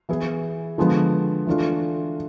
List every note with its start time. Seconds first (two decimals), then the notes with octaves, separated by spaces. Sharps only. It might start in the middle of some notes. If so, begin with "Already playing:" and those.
0.09 E3 B3 E4 G#4
0.78 D3 F3 G#3 B3
1.47 E3 A3 D4 F4